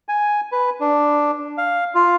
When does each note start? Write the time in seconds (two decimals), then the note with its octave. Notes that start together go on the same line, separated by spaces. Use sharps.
0.09 G#5
0.52 B4
0.81 D4
1.58 F5
1.95 F4